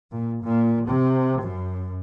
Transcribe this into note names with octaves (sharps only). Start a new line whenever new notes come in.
A#2
A#2
C3
F#2